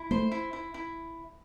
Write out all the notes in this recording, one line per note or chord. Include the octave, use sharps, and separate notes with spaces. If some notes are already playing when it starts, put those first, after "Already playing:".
Already playing: E4
A3 C5
E4
E4
E4